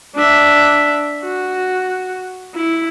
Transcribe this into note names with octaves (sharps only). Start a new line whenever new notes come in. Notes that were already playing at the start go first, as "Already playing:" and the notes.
D4 E5
F#4
E4